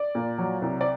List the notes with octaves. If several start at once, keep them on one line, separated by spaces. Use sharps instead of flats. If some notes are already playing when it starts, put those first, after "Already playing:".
Already playing: D5
A#2
F#3
C2
D5